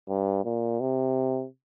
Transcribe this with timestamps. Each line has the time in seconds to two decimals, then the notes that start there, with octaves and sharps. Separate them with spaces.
0.09 G2
0.44 A#2
0.80 C3